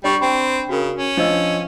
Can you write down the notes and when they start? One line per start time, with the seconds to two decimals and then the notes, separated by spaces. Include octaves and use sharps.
0.04 G3 D4 C#6
0.21 C4 B5
0.69 C#3 F#4 A#4
0.96 C#4
1.17 F3 D4 D#5 E6